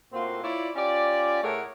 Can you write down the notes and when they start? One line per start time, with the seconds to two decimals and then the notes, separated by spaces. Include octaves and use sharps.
0.13 A2 A#3 C4 F4 F#4 C6
0.43 E4 F4 C#5 D5
0.76 C#4 F4 G4 D5
1.43 A2 A3 G#4 A#4 C#5 F#5